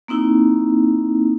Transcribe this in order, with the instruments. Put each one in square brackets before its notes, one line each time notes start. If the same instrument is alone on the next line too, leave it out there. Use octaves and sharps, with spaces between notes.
[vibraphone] A#3 C4 D#4 E4